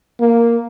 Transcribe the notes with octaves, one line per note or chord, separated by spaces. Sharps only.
A#3